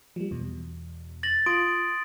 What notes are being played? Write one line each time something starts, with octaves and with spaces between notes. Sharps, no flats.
F3 G3
E2 B2
A6 A#6 F#7
F4 C6 D#6 D7